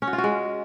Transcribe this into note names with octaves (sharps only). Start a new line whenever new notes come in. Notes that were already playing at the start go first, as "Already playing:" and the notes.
C#4
F#4
F4
F#4
G#3